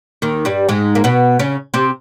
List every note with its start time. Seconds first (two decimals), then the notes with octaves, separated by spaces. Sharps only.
0.22 D#2 D#3
0.45 G2 G3
0.69 G#2 G#3
0.95 A#3
1.04 B2 B3
1.39 C#3 C#4
1.74 C3 C4